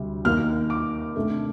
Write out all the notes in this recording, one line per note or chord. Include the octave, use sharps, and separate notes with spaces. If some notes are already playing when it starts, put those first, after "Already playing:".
Already playing: D2 C3 G3
D#2 D#3 A#3 D#4 F6
D6
C3 D#3 A3 D4